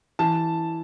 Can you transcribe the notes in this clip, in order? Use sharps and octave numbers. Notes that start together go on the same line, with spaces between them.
E3 A5